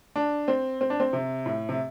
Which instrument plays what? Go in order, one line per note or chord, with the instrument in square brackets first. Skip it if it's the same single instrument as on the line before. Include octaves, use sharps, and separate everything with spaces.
[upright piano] D4
C4
C4
D4
C4
C3
A2
C3